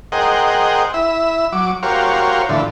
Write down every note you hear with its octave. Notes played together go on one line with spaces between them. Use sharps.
G#4 A#4 C5 D#5 F#5 G5
E4 E5
F#3 D6
F#4 G4 A#4 C5 C#5 F5
A2 D3 E3 F3